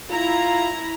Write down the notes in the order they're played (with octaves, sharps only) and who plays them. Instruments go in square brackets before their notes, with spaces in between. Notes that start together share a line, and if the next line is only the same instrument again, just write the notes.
[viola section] E4 A#5 [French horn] F4